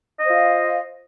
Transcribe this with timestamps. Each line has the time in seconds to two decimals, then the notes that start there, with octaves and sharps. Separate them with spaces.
0.20 D#5
0.24 C5
0.28 F4
0.33 F5